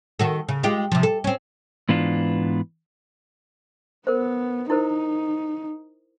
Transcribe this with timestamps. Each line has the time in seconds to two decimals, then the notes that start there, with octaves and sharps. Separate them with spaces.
0.19 D#3 F#4 A4
0.49 C#3
0.63 G#3 F4 G4
0.92 C3 F3
1.03 A4
1.24 C4 C#4
1.89 G#2 E3 B3 D4 F4
4.07 B3 A#4 C5
4.70 D#4 E4 A#4 C5